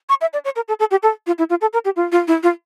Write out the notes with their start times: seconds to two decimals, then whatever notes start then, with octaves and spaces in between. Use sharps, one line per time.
0.09 C#6
0.21 E5
0.33 D5
0.45 C#5
0.56 A#4
0.68 A4
0.80 A4
0.91 G4
1.03 A4
1.27 F4
1.38 E4
1.50 F4
1.61 A4
1.73 A#4
1.85 G4
1.96 F4
2.12 F4
2.28 E4
2.43 F4